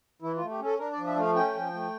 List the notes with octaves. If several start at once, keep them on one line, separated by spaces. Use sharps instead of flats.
E3 E4
F4
A3
G4
C#4 A4
D4 A#4
D5
F3
E5
A3 F5
C#4 G5
F3
A3